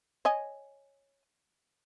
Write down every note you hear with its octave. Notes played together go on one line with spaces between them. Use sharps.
C#5 D#5 G#5